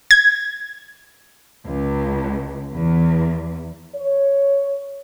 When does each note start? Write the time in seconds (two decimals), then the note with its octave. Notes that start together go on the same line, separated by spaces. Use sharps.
0.11 G#6
1.66 C#2
2.73 E2
3.96 C#5